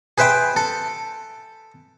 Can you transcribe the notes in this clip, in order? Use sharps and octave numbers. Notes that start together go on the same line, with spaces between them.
G#4 B4 C5 E5 G5
A4